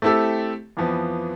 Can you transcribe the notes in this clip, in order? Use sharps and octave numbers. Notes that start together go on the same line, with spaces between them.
A3 C4 E4 G4 A4
F2 E3 F3 B3